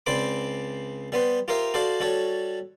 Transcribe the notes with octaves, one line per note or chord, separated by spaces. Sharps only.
C#2 C4 C5 D5 B5 D6
G3 B3 C5
F4 G4 A#4 C5 E5
F#4 A4 C5 D5 F5
G3 F#4 A4 C#5